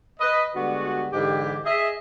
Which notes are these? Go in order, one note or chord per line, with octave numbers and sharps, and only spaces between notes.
B4 D#5
D3 G3 G#3 B3 F#4
G#2 D3 E3 G4
G#4 D#5 E5